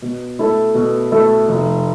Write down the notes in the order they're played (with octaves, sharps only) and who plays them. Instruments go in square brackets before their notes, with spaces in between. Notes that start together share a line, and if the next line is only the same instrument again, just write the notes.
[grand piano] B2
A3 E4 A4
B2
A3 E4 A4
F1